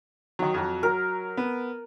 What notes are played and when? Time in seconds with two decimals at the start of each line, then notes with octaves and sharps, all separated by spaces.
0.39 D#3 F#3
0.54 F2 F#3
0.83 F#3 A#4
1.37 B3